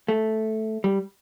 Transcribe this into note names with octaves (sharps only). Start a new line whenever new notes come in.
A3
G3